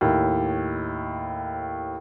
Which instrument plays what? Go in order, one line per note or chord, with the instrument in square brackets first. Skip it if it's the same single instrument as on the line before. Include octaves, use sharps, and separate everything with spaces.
[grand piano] D#2 A2